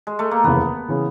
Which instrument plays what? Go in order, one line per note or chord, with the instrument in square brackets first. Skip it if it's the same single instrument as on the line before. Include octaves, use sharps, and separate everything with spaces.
[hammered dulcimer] G#3
A3
A#3
[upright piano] F1 D#2 C#3 E3 [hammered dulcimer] B3
[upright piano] C#3 E3